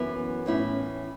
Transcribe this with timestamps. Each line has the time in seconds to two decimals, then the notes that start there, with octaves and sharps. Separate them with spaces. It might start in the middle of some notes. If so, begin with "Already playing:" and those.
Already playing: F#2 E3 B3 E4
0.46 A2 E3 C#4 E4